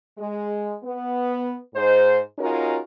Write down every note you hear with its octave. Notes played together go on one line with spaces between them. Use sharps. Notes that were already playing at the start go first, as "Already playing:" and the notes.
G#3
B3
G#2 C5
G#3 C#4 D#4 F4 F#4 A#4